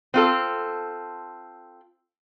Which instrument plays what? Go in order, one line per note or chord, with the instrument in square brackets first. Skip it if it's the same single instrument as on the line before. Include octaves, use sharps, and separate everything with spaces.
[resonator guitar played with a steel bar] C4 F4 A4